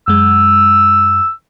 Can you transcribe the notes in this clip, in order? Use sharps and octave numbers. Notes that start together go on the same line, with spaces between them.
F#2 G#3 E6